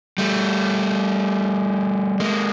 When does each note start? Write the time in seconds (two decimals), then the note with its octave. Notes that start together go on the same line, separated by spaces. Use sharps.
0.18 G3 A3
2.20 G#3 A#3